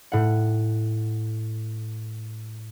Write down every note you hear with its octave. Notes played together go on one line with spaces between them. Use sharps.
A2 F#5